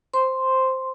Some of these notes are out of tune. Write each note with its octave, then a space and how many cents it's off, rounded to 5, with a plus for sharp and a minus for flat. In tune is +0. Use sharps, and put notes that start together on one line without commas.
C5 +0 C6 +0